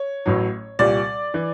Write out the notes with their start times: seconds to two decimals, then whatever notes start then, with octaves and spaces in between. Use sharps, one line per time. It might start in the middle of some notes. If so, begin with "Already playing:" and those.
Already playing: C#5
0.26 A1 A2 F#3
0.79 C2 A#2 G3 D5
1.34 E3